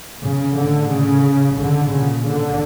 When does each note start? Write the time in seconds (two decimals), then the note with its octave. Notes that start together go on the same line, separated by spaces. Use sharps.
0.21 C#3
0.55 A2 D3
0.89 C#3
1.57 D3
1.91 A#2 C#3
2.24 D3